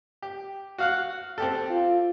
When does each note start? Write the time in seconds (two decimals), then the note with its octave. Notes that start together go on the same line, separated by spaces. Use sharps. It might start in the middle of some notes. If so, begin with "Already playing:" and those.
0.22 G4
0.78 F#4 F5 F#5
1.38 C4 G4 A4
1.70 F4